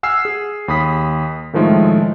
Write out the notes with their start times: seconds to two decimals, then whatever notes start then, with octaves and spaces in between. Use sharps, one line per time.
0.03 F#5 G#5 E6 F6 C7
0.25 G#4
0.68 D#2 B5 D#6 B6
1.53 A2 D#3 F3 G#3 A3